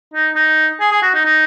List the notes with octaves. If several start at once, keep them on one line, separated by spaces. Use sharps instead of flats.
D#4
D#4
G#4
G#4
F#4
D#4
D#4